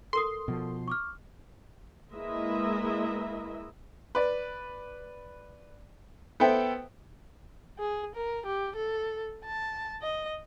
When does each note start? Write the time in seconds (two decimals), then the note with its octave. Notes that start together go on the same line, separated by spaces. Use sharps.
0.13 A4 A#4 C6 D#6
0.48 B2 F3
0.88 C#6 D6 F6
2.13 G#3 A#3 E4 B4 D#5 E5
4.15 B4 D5
6.40 B3 A4 C5 E5 G5
7.79 G#4
8.15 A#4
8.46 G4
8.76 A4
9.45 A5
10.02 D#5